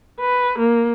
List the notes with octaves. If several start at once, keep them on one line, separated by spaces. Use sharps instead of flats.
B4
A#3